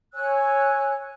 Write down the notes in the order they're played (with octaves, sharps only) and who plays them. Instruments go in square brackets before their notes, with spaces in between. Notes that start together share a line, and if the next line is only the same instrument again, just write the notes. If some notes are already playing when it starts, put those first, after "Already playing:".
[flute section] C#5 G#5 E6 F#6